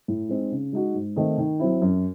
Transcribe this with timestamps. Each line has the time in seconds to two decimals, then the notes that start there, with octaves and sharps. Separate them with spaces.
0.08 A2
0.29 G#3 C4 D#4
0.52 C#3
0.73 G#3 D#4 F#4
0.94 G#2
1.16 D#3 A3 C4 D#4
1.38 D#3
1.60 F#3 C4 E4
1.82 F#2